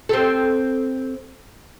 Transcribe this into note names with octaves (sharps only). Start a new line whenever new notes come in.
C4 G4 A4